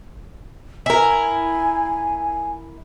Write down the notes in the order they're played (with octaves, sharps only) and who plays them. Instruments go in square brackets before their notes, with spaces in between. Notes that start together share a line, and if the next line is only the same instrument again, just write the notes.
[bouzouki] E4 A#4 [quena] G#5